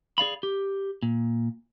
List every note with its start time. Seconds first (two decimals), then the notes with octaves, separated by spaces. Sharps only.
0.18 G#4 D5 F5 B5
0.43 G4
1.03 A#2